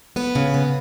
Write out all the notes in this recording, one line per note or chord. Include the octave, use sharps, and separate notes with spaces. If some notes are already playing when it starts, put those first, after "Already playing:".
B3 B4
C#3
B3